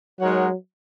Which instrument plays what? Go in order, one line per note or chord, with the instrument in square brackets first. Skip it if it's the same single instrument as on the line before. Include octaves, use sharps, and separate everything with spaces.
[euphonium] F#3 [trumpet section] G#3 D#4 A#4 C#5 F#5